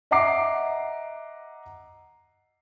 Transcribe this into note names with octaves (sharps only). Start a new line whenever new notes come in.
D#5 E5 F#5 A#5 D6 C7